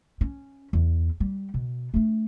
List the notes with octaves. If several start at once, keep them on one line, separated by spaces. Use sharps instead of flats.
C#4
E2
G3
B2
A3 D4